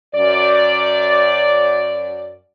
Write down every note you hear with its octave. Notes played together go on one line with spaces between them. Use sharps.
F#2 D5